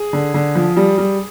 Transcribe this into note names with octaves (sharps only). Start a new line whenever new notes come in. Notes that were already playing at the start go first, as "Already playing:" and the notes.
Already playing: G#4
D3
D3
F3
G3
G3